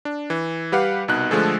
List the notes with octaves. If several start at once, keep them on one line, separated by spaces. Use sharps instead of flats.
D4
E3
G3 G4 B4 F5 F#5
C2 B2 D#4 F#6
D3 F3 G#3 A3 G#4 A4